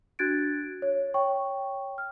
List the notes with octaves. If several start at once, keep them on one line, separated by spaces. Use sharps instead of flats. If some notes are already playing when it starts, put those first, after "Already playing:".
D4 F#4 F#6 G#6 A6 D7
C#5
C#5 G5 C#6
F6